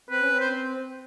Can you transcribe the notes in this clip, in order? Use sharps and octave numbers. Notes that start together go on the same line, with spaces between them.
C4 B4
C#4
C4
C5